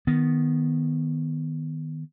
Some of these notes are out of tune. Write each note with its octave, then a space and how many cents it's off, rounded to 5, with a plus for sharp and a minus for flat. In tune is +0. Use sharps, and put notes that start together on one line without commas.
D#3 +0 B3 +0